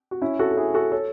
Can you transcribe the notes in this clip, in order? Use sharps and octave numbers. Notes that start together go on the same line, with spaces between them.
F#4
C#4 E4
F#4 A4
A4
E4 G#4
F#4 A4
A4 C#5